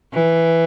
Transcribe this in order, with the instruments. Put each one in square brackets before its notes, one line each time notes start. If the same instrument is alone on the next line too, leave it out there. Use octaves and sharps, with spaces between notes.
[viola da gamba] E3